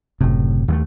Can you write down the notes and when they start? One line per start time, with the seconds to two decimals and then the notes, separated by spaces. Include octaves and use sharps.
0.21 F#1 A2 C3
0.68 D#2 G#3 A3